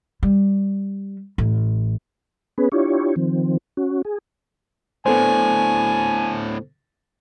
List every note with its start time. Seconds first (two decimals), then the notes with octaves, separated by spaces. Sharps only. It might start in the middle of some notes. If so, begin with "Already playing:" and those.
0.23 G3
1.38 A1
2.58 B3 C#4 G#4 B4
2.72 D4 E4 F4 G4 C#5
3.16 D#3 F3 C4
3.77 C#4 F#4
4.05 G#4
5.06 A2 D3 B3 A4 C5 G#5